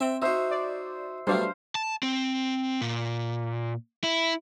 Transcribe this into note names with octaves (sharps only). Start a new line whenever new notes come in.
C4 E5 G5
D#4 F#4 C5 E5
D5
B2 F#3 G3 A3 D4 C5 F5
A5
C4
A#2
E4